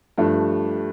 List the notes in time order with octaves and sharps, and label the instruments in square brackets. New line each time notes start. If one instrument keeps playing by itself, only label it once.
[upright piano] G2 F3 A3